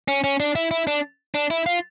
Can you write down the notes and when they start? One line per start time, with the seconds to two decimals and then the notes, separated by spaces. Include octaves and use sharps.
0.08 C#4
0.24 C#4
0.40 D4
0.55 E4
0.71 E4
0.87 D4
1.35 D4
1.50 E4
1.66 F4